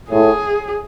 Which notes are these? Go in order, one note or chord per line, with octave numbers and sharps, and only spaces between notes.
A2 G#4